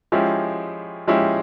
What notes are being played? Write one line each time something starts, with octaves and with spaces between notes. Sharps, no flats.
F3 G#3 C#4 E4 G4
F3 G#3 C#4 E4 G4